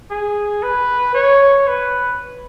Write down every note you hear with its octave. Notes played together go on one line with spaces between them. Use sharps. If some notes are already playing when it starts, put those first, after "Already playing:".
G#4
B4
C#5
B4